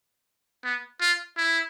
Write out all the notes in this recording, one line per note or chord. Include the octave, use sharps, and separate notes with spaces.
B3
F4
E4